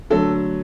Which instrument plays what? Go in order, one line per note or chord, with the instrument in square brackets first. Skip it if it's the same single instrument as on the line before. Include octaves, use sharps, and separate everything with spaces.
[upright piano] D3 F#3 A3 A4